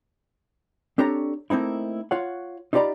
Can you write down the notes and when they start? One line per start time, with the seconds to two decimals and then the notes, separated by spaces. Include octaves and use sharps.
0.98 C4 D4 G4 A4 C#5 A#5
1.50 A3 A#3 C4 D#4 E4
2.11 F4 C#5 F#5
2.73 D#4 F4 G4 D5 A#5 B5